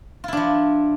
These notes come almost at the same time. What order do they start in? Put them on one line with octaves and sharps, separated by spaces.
F4 E4 D4 F3